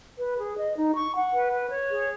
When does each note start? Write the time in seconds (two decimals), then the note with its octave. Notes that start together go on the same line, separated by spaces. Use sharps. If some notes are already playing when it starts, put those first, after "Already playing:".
0.18 B4
0.37 G#4
0.57 D#5
0.75 D#4
0.95 C#6
1.15 F#5
1.33 B4
1.51 B4
1.70 C#5
1.90 G#4